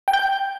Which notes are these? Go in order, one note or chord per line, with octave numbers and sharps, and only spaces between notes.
G5
G6
G5